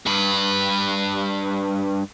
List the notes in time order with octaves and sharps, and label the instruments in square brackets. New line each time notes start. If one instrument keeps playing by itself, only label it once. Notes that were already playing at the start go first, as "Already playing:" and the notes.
[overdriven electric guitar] G2 B4